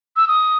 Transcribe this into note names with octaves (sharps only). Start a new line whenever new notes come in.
E6
D#6